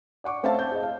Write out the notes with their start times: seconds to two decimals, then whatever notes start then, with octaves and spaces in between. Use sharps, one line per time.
0.24 D5 F#5 C#6 D6
0.43 A3 C4 C#5 E5 F5 A5
0.59 A5 G6
0.72 G#4 D#5
0.83 F5